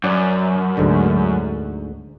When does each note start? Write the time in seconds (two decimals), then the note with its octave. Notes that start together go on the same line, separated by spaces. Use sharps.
0.04 F#2 C#5 D5 F#5
0.77 D2 G#2 D3